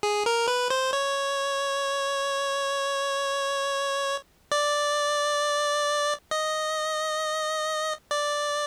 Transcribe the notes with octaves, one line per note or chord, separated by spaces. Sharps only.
G#4
A#4
B4
C5
C#5
D5
D#5
D5